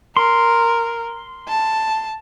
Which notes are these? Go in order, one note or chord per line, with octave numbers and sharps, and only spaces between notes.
A#4 C6
A5